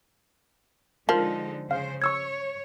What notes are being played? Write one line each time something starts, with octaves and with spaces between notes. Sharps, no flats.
D3 F3 G#3 D#4 F4 A#4
C#3 C5 F5
C#5 C#6 E6 G#6